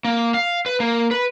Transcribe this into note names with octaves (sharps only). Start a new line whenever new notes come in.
A#3
F5
B4
A#3
B4